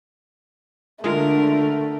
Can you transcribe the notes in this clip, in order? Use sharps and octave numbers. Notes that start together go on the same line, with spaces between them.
D3 G#3 A3 F4 A#4